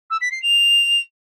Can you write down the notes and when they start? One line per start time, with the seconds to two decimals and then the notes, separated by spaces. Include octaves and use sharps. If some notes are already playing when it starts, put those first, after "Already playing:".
0.10 E6
0.21 B6
0.31 C7
0.42 F7